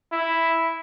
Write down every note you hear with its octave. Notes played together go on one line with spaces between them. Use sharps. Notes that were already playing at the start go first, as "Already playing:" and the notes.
E4